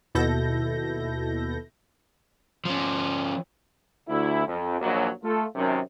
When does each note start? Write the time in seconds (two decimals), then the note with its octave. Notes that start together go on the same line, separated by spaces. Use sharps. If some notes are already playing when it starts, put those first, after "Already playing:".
0.15 D#2 B2 E4 A4 G6 A#6
2.65 F3 C#4
4.09 D2 E4
4.47 F2
4.81 A#1 D#2 F#3
5.24 A3 F4 A4
5.55 F#2 C3 D#3